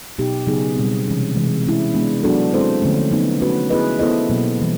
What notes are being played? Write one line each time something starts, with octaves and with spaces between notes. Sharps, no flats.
B2 F#3 B3 D#4 G4
C#3 F#3 B3 D#4 G#4
B2 G3 C4
C3 E3 G#3 C#4
C3 E3 G#3
G#3 C#4 E4
G#3 B3 D4
F#3 B3 D4 F#4 A4
G#3 C4 E4 A4 C5
D3 F3 A3 C#4
F#3 B3 D#4
A3 C#4 F#4 B4
B3 E4 G#4 B4 D#5
B3 E4 A4 C5 D#5
B2 F#3 A#3
E3 G3 A#3